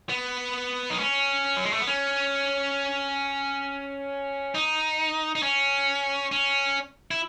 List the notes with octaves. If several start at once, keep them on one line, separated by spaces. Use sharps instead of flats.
B3
D#4
C#4
F#3
G#3
A3
B3
C#4
D#4
D#4
C#4
C#4
E4